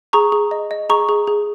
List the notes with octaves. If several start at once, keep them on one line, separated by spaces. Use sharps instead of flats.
G#4 A#5 C#6
G#4
D#5
D#5
G#4 A#5 C#6
G#4
G#4